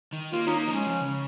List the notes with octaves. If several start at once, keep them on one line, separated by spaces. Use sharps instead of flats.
D#3
A#3 F4
C#4 D#4
A#3
D#4
F3
G#3 C#4
F3
C#3